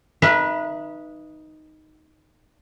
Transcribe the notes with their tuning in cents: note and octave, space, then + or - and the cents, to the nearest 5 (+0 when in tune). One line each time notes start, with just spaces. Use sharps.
D#4 +0 B4 -20 E5 +30